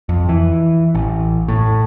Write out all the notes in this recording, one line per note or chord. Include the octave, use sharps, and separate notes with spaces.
F2
E3
A1
A2